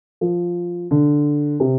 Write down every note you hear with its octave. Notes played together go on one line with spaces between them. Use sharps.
F3
D3
C3